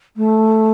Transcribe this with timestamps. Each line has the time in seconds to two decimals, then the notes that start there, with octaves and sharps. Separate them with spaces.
0.16 A3